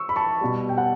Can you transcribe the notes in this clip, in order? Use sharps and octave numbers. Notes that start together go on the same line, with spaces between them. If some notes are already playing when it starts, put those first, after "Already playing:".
Already playing: C#6 E6
B5
A5 C#6
B2 G3
G5
F#5 A5